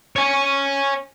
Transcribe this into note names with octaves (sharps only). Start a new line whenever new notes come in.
C#5 G#5